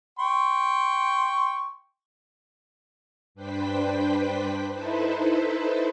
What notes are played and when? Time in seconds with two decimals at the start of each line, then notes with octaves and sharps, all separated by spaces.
0.19 G5 C6 C#6
3.35 G2 D4 B4 C5 G5 B6
4.73 D#4 E4 A4 B4 C5 E5